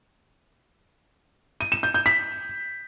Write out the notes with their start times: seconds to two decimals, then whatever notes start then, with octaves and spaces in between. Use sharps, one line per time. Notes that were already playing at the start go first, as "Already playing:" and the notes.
1.61 D#7
1.72 E7
1.83 G6
1.94 G6
2.06 B6